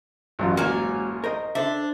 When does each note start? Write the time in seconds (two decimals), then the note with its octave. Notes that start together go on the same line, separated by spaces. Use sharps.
0.39 A1 F#2 F4
0.57 G#2 A#3 C#4 F#4 G#5
1.24 A#4 C5 D#5
1.55 D4 A4 C5 E5